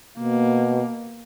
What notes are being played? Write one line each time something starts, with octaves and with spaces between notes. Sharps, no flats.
B2 A#3